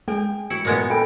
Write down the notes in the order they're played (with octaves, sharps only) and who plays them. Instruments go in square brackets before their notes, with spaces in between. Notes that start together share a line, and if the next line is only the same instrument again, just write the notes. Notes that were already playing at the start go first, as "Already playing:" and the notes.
[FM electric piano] G#3 G#4 [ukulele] G5
[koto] E4 [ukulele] F#4 [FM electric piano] C#7
[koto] A#2 G#3 B3
[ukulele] A4 G5 B5 [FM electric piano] G#5